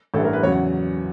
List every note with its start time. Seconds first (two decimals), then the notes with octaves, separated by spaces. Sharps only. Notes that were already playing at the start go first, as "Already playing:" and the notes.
0.14 A1 G2 E3 G3 A4
0.24 A#4
0.33 B4
0.43 E2 C#3 F#3 C#5
0.52 F#5